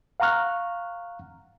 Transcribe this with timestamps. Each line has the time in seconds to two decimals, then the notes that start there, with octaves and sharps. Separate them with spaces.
0.20 F5 F#5 A#5 C#6 F6 F#6